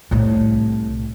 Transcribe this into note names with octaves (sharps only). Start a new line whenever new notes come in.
C2 A2